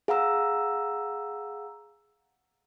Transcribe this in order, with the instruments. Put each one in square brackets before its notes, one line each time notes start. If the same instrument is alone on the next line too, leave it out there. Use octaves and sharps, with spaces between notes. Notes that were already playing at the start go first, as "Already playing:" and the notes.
[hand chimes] G#4 F5 F#5 A#5 E6